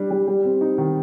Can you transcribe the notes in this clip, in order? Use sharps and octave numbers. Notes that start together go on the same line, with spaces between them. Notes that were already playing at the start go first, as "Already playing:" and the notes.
Already playing: G3 D4 G4
G3
G3
C4
D#4
D#3